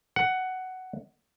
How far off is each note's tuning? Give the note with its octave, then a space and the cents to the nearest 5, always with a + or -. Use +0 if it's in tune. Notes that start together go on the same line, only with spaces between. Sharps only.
F#5 +10